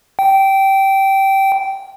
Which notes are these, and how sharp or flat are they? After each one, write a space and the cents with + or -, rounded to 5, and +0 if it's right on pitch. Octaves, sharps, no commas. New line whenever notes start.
G5 -15